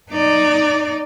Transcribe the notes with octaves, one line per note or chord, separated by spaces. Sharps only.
D#4 D5